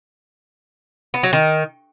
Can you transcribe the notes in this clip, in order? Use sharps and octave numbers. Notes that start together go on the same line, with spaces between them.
B3
F#3
D#3